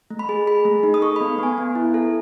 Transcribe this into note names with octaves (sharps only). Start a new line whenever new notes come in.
A3
B5
G#4
G#4 B5
A3
D#4
D#6
A4 C#6
B3 B5
B3 G#5
B3
E4
A4